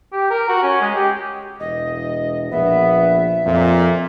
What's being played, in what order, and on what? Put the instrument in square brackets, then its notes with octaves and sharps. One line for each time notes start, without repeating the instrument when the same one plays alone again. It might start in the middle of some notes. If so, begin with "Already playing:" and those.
[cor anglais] G4
A#4
F#4
C#4
G#3
G4
[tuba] E1 [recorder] D#5
[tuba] A#1 [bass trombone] B3 [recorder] E5
[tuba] F2 [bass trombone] A#2